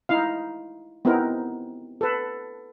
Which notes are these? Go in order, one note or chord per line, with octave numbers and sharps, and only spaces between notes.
D#4 E4 F5
B3 C4 D#4 E4 A#4
A4 B4